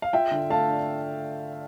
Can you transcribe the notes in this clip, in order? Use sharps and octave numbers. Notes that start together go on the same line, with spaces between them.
F5
F4 E5 G5
D3
A3 F5 A5
D4